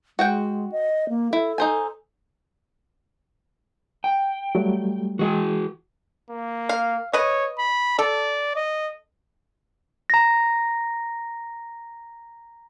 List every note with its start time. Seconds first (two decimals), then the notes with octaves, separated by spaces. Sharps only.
0.19 G#3 F#4 F#5 G5
0.72 D#5
1.09 A#3
1.33 E4 A4
1.58 D#4 C5 G#5
4.04 G5
4.55 F#3 G3 A3
5.19 E3 G#3 F#4 G#4
6.30 A#3
6.69 F5
7.13 B4 C#5 D#5
7.59 B5
7.99 A4 D5
8.56 D#5
10.10 A#5 A#6